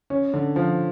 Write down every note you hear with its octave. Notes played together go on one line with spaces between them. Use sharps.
C#4
D3
F3